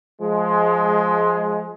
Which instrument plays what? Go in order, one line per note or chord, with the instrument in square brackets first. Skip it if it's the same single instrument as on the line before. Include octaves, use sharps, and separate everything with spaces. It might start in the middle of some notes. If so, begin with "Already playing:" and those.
[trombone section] F3 G#3